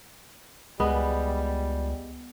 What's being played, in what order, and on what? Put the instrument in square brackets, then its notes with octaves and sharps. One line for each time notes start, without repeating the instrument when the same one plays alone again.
[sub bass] C#2 [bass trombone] G3 [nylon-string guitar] G#3 [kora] B3